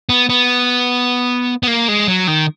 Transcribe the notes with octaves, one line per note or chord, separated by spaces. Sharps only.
B3
B3
B3
A#3
G#3
F#3
D#3